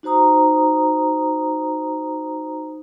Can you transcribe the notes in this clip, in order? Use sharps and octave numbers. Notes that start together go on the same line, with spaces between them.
D#4 F#4 C5 A#5 D#6